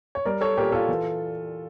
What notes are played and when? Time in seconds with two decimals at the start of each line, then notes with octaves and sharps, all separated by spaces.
0.15 C#5
0.25 G3 A#4 D5
0.41 A4 C#5
0.57 A#2 G4 A#4
0.72 F4 A4
0.89 E3